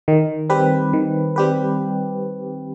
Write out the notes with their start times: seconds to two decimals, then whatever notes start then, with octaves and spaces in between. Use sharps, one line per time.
0.08 D#3
0.50 G3 C4 G4 B4
0.93 D#3
1.36 G3 C4 G4 B4